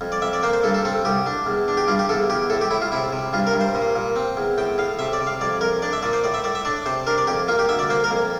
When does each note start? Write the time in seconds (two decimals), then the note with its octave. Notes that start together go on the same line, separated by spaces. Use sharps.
0.01 F2
0.12 D5
0.22 F2 E5
0.33 D5
0.43 A#3 C5
0.53 C5
0.63 G2 A4
0.74 A4
0.85 C4 A4
1.05 C2 G4
1.26 D4
1.46 E2
1.68 D4
1.77 G4
1.88 G2 F4
1.99 G4
2.09 E2 A4
2.30 E2 G4
2.50 A2 A4
2.61 G4
2.71 A2 E4
2.82 F4
2.92 C3 E4
3.12 C3
3.33 G2 F4
3.47 A#4
3.54 G2
3.61 C5
3.75 A#2
3.96 A#2
4.16 C4
4.37 E2
4.58 A2 G5
4.78 A2 F5
4.99 C3 E5
5.13 D5
5.20 C3
5.27 F5
5.41 F2 D5
5.61 F2 A#4
5.82 D4 D5
5.93 E5
6.02 A#2 D5
6.13 C5
6.24 A2 D5
6.34 E5
6.44 A2 D5
6.55 E5
6.65 D4 D5
6.86 C3 C5
7.07 D4 A#4
7.18 D5
7.27 F2 G4
7.48 A#3 F4
7.59 G4
7.69 D2 E5
7.79 D5
7.90 A#3 C5
8.04 A#4
8.11 F2